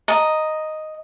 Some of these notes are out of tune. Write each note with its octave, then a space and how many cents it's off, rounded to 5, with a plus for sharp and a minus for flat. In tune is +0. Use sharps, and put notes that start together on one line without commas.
D#5 +0 A#5 +0